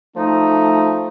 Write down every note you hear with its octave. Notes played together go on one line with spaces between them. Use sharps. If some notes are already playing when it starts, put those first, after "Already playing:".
F3 A3 D#4